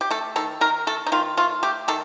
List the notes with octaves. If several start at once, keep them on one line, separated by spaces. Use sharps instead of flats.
G4
A3 A4
D#3 A4
D#3 A#4
A3 A4
D#4
D#3 F4
A3 F4
A3 G4
D#3 A4